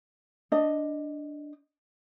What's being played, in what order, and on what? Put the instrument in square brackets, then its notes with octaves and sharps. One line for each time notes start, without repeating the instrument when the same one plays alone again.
[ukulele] D4 D#5